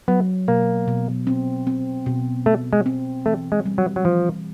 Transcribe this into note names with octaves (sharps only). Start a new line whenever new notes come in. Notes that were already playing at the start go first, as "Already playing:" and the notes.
F#3 B3
B2 A#3
B2
C4
C4
B2
A3 C4
G#3
C4
E3 A3
G#3
G3
F#3
F#3
E3 F3